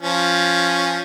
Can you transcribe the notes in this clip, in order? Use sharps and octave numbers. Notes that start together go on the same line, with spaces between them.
F3 C#4